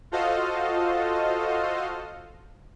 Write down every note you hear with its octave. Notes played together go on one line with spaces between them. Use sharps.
F4 F#4 A4 C5 D#5 F5